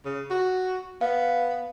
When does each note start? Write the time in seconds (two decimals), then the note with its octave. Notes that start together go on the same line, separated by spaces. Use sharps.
0.05 C#3
0.30 F#4
1.01 B3 F5